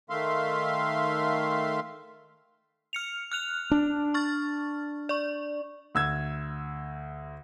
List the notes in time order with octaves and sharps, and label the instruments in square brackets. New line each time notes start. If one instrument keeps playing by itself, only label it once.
[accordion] D#3 A3 E5 F5 C6
[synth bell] F6 C#7 F7
F6 F#6 F7
[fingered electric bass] D4
[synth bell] C#6 F6 A6
D5 C#6
[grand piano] D2 E6 G#6